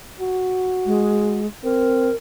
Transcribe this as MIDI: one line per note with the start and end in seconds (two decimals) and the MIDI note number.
0.20 1.41 66
0.86 1.47 56
1.64 2.10 60
1.64 2.16 70